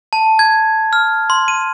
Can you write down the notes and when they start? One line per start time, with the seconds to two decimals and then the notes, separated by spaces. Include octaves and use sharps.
0.13 A5
0.39 G#6
0.93 F6
1.30 C6
1.48 D#7